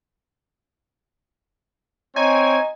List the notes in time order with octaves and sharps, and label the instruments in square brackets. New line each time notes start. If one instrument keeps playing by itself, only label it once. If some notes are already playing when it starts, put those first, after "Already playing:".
[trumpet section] C4 C#5 [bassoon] D#4 [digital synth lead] G#5